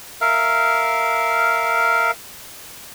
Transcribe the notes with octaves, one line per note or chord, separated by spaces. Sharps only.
A#4 E5 F5